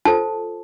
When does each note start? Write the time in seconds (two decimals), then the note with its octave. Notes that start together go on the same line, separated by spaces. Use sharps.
0.05 F4 A4 C5 A5